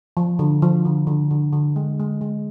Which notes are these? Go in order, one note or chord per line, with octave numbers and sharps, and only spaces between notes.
F3
D3
F3
D3
D3
D3
D3
G#3
G#3
G#3